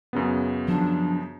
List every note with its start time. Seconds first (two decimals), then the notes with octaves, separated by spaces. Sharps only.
0.13 F#2 C#3 B3
0.68 F3 F#3 D4